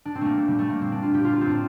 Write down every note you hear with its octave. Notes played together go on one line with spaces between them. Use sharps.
D4
A#2 C4
A3 A#3
A3
A#2 G3
A3
A#3
A#2 C4
D4
F4
A#2 G4
F4
F4
C4
A2 D4